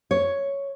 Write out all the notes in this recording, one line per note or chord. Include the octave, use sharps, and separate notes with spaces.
C#5